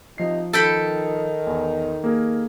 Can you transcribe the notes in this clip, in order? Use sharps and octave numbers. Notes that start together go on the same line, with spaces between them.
C3 F3 D#4 C7
D#3 A4 G5 B5
E2
A#3 G#4 A#4